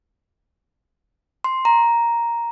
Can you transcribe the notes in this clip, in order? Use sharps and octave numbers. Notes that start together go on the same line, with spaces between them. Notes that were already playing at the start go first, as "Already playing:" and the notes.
C6
A#5